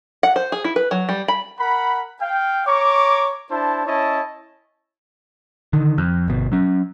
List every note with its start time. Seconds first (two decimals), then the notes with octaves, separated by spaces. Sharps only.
0.23 F#5
0.36 C5
0.52 G#4
0.64 E4
0.76 B4
0.91 F#3
1.09 G3
1.28 B5
1.60 A#4 F#5 B5
2.21 F5 G5
2.67 C#5 A#5 C#6 D6
3.50 D4 E4 C5 A5
3.86 C#4 E4 C#5 D#5 A5
5.73 D3 D#3
5.98 F2
6.28 G1 B2
6.52 F#3 C#4